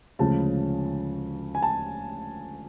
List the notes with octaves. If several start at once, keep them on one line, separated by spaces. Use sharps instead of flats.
D2 C#3 F3 G#3 C#4 A5
G#5
A5